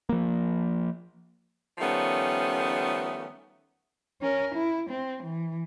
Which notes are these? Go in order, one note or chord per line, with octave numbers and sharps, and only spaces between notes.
F3 A#3
D#3 F3 G3 A3 B3 C#4
C#4 A#4
E4
C4
E3